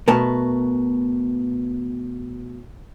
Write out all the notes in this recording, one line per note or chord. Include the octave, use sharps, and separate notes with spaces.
B2 A3 A#4 B4 A5